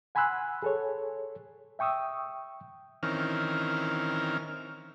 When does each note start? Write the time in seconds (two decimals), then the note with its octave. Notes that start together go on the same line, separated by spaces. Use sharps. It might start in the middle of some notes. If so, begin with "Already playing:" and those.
0.15 F#5 G#5 B5 C6 E6 F#6
0.62 G#4 A4 C#5
1.79 E5 G5 C#6 D#6 E6
3.03 D#3 E3 C4 C#4 A#4 F6